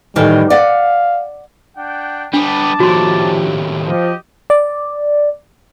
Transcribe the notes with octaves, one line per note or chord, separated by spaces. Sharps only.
A2 D#3 E3 G3
D5 F5 F#5
D4 F#5 G5
G3 B3 D4 A5 D6
D#2 A2 F3 D4 F#4 G4 C6
F3 G4 D#5
D5